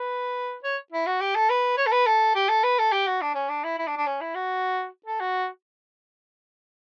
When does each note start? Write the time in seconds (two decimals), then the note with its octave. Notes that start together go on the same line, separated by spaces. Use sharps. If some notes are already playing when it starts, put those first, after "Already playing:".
Already playing: B4
0.64 C#5
0.92 E4
1.06 F#4
1.21 G4
1.35 A4
1.50 B4
1.77 C#5
1.86 A4
1.92 B4
2.06 A4
2.35 G4
2.49 A4
2.63 B4
2.78 A4
2.92 G4
3.07 F#4
3.21 D4
3.34 C#4
3.49 D4
3.64 E4
3.78 E4
3.87 D4
3.97 D4
4.06 C#4
4.21 E4
4.34 F#4
5.06 A4
5.20 F#4